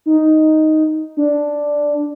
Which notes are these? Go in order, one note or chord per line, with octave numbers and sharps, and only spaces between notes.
D#4
D4